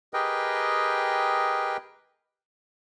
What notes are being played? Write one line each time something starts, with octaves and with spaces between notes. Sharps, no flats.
G4 G#4 A#4 B4 D#5 G5